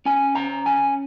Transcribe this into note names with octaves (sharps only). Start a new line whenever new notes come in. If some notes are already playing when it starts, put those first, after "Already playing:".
C#4 G#5
C#3 A#5
C#4 G#5